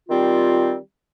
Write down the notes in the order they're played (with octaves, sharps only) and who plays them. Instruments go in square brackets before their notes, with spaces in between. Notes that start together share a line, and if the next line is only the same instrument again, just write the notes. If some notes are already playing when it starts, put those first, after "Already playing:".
[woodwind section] D#3 G3 C4 F4